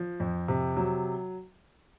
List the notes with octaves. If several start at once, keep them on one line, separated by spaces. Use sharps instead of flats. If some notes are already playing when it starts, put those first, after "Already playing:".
Already playing: F3
F2
C3
F#3